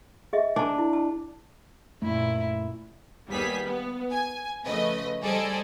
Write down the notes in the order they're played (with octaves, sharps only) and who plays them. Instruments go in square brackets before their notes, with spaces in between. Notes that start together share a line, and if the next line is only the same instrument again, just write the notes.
[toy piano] G#4 D#5 E5
[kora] D4 [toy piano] G#5 A5
[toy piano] E4
A5
[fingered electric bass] F#2 A3 [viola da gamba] A#2 E4
[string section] D#2 G3 B3 G#4 B6
B3
G#5
C#3 F3 A3 B4 D#5
G3 G#4 A4 C5 D5 D#5